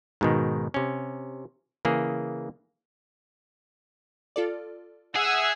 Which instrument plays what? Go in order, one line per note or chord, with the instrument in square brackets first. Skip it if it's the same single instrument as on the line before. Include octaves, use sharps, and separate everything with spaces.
[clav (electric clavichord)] G#2 B2 D#3
C3 C#4
C#3 E3 A#3 G#4
[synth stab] F4 A4 D5
[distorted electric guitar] G#4 [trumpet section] E5 F#5 [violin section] E6